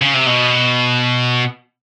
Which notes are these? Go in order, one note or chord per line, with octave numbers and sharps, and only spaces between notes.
C#3
C3
B2